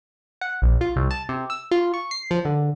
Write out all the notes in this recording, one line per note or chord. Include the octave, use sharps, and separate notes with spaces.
F#5
A#1
F4
C2
A5
C3
E6
F4
C#6
C7
F3
D3